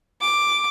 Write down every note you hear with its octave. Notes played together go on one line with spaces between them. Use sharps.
D6